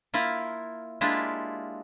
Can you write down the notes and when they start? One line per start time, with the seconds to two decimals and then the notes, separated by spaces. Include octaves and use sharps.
0.14 A#3 E4 F4 A#4
1.01 G#3 A#3 D4 E4 F4 G4